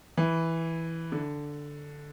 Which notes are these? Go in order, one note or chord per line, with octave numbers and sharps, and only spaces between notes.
E3
D3